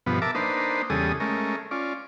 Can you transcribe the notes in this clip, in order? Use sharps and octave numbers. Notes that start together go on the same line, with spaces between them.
G2 B2 F3 B3
A#4 E5 A5 D6
A#3 D4 D#4 B4 C5
E2 C#3 G3 G#4 A4 D#6
G#3 A3 C#4 A#4
C#4 F4 D5